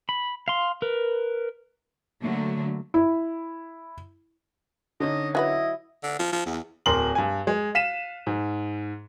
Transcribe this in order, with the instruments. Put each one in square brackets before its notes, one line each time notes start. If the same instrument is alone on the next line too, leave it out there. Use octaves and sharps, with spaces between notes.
[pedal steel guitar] B5
F5 C6
A#4 B4
[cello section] D3 F#3 A3 A#3
[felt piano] E4
[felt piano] D3 C#4 D#4 [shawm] D#5
[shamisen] F#3 F#4 B4 [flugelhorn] E4 [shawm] D#5
[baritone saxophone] D3
F3
F3
E2
[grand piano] D1 A#4 C6 F#7
G2 G#5
G#3
F5 B6 D#7 E7
G#2